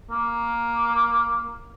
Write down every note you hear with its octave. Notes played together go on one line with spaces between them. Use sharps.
A#3